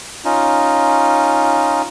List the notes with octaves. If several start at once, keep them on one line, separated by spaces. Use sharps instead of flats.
C#4 D#4 F4